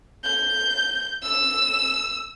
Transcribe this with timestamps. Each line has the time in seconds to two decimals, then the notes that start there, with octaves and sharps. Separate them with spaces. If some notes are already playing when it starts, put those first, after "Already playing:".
0.24 G6
1.22 E6